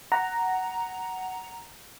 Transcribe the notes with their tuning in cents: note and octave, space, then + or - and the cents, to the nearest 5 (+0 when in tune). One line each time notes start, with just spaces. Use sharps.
F#5 +10 A#5 +0